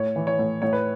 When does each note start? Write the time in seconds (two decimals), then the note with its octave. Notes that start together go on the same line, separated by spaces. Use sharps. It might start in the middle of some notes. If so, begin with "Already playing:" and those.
Already playing: A2 C#5
0.16 E3
0.27 C#5
0.39 A2
0.62 A2 C#5
0.73 B4